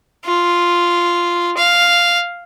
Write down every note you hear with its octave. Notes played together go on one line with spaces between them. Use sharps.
F4
F5